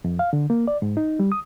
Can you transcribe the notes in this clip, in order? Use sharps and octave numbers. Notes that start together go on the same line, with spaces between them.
F2
F5
D3
A#3
D5
G#2
D#4
G3
D#6